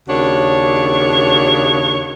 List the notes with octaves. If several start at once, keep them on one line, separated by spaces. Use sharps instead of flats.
D#2 C#3 D4 F#4 C#5